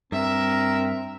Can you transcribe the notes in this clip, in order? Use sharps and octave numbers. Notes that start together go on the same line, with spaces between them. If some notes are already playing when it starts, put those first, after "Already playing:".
G2 C4 A#4 E5